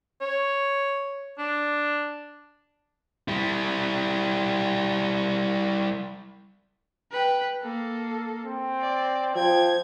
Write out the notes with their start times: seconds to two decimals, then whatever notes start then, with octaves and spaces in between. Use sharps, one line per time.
0.21 C#5
1.39 D4
3.28 G3 E4
7.12 B4 G5
7.62 A#3 A4
8.45 C4
8.81 D5
9.36 F3 G5 G#6